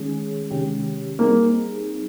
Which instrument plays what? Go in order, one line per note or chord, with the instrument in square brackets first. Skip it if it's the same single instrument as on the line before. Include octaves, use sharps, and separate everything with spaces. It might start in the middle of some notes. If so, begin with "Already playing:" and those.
Already playing: [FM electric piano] D#3 G#3 C#4 G#4
C3 D#3 G#3 C#4 G4
[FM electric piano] G3 C4 D#4 G#4 [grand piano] A#3